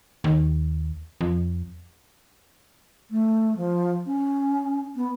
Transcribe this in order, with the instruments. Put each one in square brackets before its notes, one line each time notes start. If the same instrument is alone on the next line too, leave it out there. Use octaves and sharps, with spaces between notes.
[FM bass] D#2
F2
[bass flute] A3
F3
C#4
B3